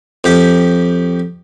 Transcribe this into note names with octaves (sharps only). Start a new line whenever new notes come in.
F2 G4